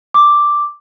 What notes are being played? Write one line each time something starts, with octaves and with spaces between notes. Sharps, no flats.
D6